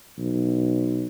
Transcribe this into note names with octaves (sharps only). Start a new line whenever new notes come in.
B1